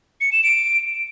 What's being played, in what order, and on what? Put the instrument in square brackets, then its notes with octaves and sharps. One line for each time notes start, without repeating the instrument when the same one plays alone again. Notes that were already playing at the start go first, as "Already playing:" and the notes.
[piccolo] C#7
E7
D7